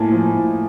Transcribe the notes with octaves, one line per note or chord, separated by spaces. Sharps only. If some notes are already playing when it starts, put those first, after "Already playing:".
Already playing: A2 A#3 G#5 A5
F3
A2